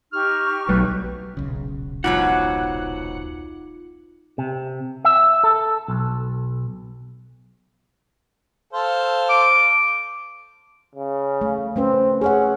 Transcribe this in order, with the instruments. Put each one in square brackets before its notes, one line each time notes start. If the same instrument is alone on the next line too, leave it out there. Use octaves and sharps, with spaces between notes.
[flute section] D#4 G4 C#6 [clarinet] F6
[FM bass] B1 [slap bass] F#3 G3 A3 [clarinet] B4
[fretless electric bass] D#1 B1 C#3
[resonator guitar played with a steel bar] G#2 B2 F#3 [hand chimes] D#4 F4 D6 [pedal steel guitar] F#5
[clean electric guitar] C3
E5
A4
B1
[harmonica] A4 C5 F5
[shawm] D6
[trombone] C#3
[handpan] A3
[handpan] A3 C#4 B4 [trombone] C4
[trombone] C#4 [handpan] G#4 C#5 F#5